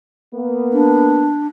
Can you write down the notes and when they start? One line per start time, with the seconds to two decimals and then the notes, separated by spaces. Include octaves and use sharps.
0.34 A#3 B3
0.73 D4